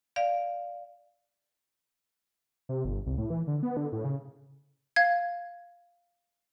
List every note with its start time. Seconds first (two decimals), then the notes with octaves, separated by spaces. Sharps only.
0.16 D5 F5
2.69 C3
2.85 G1
3.06 C2
3.18 A2
3.30 E3
3.47 D3
3.63 B3
3.77 D3
3.92 A2
4.05 C#3
4.96 F5 G#6